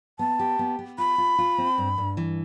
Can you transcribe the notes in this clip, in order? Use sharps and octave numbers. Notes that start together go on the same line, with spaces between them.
B3 A5
G4
B3
B3
F4 B5
F4
F4
C4
G2
G2
E3